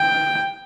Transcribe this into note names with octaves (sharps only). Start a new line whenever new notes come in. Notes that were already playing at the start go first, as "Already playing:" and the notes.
Already playing: G5